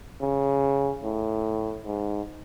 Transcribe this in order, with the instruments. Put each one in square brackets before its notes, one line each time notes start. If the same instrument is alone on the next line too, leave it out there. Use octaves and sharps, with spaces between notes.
[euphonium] C#3
A2
G#2